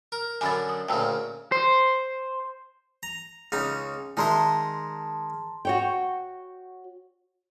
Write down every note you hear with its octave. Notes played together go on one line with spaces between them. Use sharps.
A#4
F#2 D3 D4 G#5 B5 A6
D#6
D2 A#2 C#3 G5 A5 E6
C5
A#5
C#2 C#3 D#4
D#3 G#3 E5 A5 A#5 C6
F#4 C#5 G5